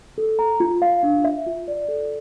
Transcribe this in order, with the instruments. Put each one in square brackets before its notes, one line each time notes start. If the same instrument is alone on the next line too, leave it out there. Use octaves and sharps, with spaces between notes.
[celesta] A4
A#5
F4
F5
D4
E5
F4
D5
A4